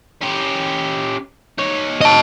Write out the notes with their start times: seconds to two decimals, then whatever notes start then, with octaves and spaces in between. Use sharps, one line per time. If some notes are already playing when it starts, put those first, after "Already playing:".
0.21 C#4 G4
1.58 D#4 C#5
2.01 D#5 A5